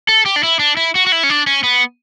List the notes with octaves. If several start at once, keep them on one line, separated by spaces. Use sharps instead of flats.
A4
G4
D4
E4
D4
E4
F#4
F#4
E4
C#4
D4
C#4
B3